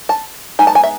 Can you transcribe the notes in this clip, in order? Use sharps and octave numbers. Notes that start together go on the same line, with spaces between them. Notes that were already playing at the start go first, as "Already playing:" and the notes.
A5
G#3 B3 D#4 G#5
A5
G#5
E5